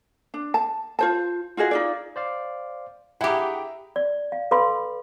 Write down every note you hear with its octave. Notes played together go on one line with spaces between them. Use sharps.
D4
A5
F4 C5 A5
F4 F#4 G#4 D#5
D#4 F4 D5
C5 D5 F5
E4 G4 G#4 E5 F#5 G5 A#5 B5
D5
F5
A4 B4 F5 B5 C6